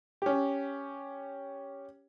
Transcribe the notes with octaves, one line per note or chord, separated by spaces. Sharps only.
C#4 G4